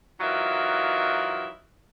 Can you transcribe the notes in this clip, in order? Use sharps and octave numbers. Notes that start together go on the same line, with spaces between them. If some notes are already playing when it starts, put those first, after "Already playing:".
E3 F#3 D#4 F4 A#4 E5